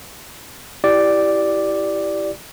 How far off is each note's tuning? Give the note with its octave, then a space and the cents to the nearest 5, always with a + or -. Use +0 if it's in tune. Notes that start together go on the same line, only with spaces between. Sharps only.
E4 +0 G4 -15 D5 +0